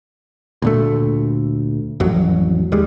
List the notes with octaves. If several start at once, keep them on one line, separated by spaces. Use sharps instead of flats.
D2 A#2 A3
A1 F2 F#3
D#2 G3 G#3